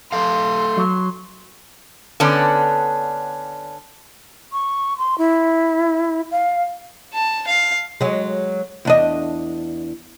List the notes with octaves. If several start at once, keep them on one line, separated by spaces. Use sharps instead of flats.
A3 A4 F5 C6
F#3
D3 B3 C#4 D4
C#6
C6
E4
F5
A5
F5
F#3 G#3
E2 D4 D#5